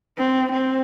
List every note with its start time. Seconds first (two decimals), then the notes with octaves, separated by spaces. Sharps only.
0.18 C4
0.52 C4